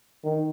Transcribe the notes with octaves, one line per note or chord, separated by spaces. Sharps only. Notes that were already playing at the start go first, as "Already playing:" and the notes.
D#3